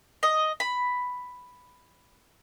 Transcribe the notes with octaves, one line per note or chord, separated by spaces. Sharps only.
D#5
B5